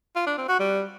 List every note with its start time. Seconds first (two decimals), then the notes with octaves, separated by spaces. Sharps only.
0.16 F4
0.27 D4
0.38 C4
0.49 F#4
0.60 G3